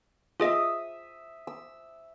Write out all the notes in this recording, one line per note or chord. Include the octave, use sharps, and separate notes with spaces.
F4 G#4 D#5 E5 D#6
E6